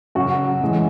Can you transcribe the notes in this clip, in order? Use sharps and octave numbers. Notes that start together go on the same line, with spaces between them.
F#2 C#3 F#3 F#4
F#2 E3 G#3